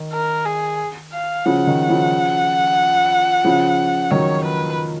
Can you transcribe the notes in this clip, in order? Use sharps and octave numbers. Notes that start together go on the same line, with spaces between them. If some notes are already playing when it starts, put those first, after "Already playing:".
Already playing: D#3
A#4
G#4
F5
C#3 F3 F#5
D#3
C#3 F3
C#3 F3
D#3 F#3 C#5
B4